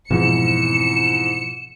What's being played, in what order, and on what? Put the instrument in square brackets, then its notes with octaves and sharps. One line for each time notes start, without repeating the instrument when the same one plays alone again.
[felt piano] F2 G#2 E3 [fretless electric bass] B2 F3 [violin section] C#7 [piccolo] E7